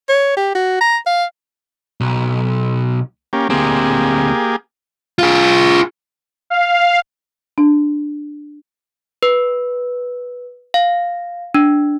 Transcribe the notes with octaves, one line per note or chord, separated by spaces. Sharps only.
C#5
G4
F#4
A#5
F5
B1
A#3 C#4 G4
D2 A#3 C4 G4 G#4
F4 G#4
F5
D4
B4
F5
D4